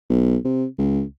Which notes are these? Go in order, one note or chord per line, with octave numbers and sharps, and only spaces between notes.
B1
C3
C#2